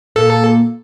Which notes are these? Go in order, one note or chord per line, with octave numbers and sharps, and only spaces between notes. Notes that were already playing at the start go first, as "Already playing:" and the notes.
A#2 A#3 A4